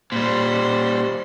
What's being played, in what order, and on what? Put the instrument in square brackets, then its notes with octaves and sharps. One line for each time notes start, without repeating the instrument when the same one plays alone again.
[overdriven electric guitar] A#2 G3 [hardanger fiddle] C5